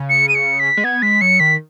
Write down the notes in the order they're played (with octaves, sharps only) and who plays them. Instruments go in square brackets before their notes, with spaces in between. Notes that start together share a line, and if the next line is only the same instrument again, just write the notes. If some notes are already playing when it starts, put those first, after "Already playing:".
Already playing: [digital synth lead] C#3
[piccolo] C#7
D#7
C#7
B6
[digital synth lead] G#3
[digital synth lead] B3 [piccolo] G#6
[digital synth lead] G#3 [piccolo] B6
[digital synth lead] F#3 [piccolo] C#7
[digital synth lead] D#3 [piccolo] B6